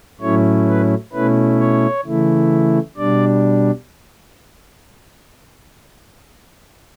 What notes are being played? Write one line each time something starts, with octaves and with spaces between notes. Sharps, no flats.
A2 F#3 A3 C#4 E4 C#5
B4
B2 A3 C#4 E4 B4
C#5
C#3 E3 A3 E4
B2 G3 D4 D5